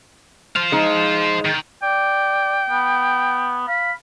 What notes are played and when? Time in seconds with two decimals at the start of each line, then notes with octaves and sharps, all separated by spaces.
0.56 C5 F5
0.72 G#3 D#4
1.45 D#3
1.83 D5 G5
2.70 B3
3.68 F5 B5